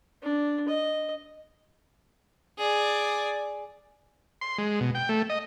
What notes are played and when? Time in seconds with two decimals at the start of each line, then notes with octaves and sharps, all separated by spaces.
0.22 D4
0.68 D#5
2.59 G#4 D5
4.41 C6
4.58 G#3
4.81 B2
4.95 G5
5.09 A3
5.30 D#5